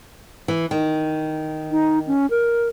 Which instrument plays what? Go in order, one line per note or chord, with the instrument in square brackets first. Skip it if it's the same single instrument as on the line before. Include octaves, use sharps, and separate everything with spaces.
[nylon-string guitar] E3
D#3
[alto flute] D#4
C#4
A#4